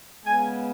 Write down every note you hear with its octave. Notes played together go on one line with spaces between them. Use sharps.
C#3 G#3 B3 G#5